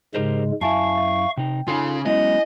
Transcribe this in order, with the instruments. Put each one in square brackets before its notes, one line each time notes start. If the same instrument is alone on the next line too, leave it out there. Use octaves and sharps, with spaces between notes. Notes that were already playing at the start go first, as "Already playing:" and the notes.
[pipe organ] G#2 C#3 G#3 [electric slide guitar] G4 A#4 C5
[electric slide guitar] F#2 E4 [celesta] E5 G#5 A5 [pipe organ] F5 C#6
[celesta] E5
[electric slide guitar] C3 D#4 [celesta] G5
[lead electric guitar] C#3 [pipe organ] C#4 [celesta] D#4 C6 [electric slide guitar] F4 A4 F5
[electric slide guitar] F#3 G#3 B3 [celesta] E4 [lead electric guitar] D#5